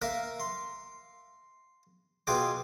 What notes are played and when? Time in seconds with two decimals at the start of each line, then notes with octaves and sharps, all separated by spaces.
0.02 A#3 A#4 E5 F5
0.40 C6
2.27 B2 F4 G#4 G5 C6 D6